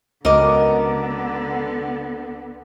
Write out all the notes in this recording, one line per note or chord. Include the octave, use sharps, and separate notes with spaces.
C#2 D3 B3 F#4 A#4 D#5 D6